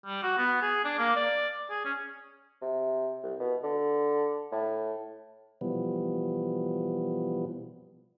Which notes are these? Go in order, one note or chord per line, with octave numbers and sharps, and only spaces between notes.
G3
F#4
B3
G#4
D4
A#3
D5
G#4
C#4
C3
C2
B2
D3
A2
B2 E3 F3 G3 B3